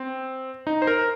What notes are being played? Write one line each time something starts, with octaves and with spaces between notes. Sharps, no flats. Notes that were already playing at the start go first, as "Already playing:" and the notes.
Already playing: C4
D#4
C5
A#4